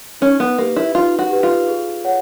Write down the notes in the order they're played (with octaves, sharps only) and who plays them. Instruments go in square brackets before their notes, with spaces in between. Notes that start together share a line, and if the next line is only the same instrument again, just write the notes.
[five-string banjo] C#4 [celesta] D#4
[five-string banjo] B3
[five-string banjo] A#3 [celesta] G4 B4
[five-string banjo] E4
[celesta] D#4 [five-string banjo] F4
[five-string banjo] F#4
[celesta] G4 B4
[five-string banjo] F4
[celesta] G#4
C#5 F#5